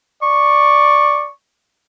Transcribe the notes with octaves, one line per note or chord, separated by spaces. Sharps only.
D5 C#6